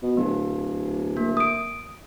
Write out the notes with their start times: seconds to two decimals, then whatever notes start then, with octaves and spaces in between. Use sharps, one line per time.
0.03 B2
0.17 D1 B3
1.17 A#3
1.37 D#6 D7